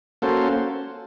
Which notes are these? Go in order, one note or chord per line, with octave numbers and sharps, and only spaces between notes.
A#3 C#4 F#4 A4 C5